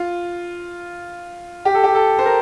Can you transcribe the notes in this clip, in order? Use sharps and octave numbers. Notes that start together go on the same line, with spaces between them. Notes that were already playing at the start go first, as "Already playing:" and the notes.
Already playing: F4
G4
A4
G4
A4
C5
A#4